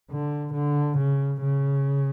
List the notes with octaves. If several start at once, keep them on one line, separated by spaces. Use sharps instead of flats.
D3
D3
C#3
C#3